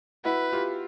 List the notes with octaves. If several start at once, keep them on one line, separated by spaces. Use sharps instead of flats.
E4 F#4 B4
F4 G4